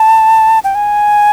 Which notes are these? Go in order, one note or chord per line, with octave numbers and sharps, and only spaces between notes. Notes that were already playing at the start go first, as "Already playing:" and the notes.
Already playing: A5
G5
G#5